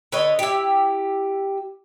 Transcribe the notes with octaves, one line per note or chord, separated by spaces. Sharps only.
D3 B4 C#5 D#5
E4 G4